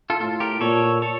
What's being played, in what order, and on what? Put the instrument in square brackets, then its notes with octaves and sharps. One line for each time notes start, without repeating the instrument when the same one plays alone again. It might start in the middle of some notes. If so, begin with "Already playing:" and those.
[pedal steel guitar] F4 A4
[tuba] A2 [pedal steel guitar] F4 A4
[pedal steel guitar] G4 A#4
[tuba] A#2 [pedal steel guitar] A4 C#5
[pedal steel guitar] A4 C#5